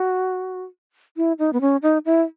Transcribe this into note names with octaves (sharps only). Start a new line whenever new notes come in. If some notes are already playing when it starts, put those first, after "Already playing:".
Already playing: F#4
E4
D#4
B3
C#4
D#4
E4